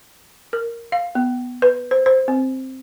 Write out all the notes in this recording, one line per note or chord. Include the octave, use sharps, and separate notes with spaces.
A#4
F5
B3
B4
C5
C5
C4